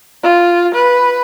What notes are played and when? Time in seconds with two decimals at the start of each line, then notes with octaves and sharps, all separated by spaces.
0.23 F4
0.75 B4